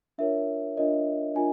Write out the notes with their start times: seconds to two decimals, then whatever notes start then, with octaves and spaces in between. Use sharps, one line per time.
0.18 D4 F4 A#4 C#5 E5
0.77 D4 F4 A#4 C#5 D#5
1.35 D4 F4 A#4 G#5